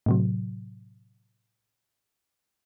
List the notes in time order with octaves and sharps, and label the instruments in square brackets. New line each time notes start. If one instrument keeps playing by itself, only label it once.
[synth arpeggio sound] A2 C3 F#3